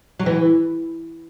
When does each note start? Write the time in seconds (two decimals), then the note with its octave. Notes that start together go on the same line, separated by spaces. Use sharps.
0.19 F#3
0.26 E3